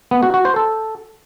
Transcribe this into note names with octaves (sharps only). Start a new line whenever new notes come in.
B3
F#4
F#4
C5
A4